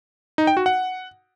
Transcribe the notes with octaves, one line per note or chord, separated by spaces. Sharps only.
D#4
G5
F#4
F#5